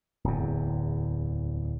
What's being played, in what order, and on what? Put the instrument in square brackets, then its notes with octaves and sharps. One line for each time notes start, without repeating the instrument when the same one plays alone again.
[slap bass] D1 E2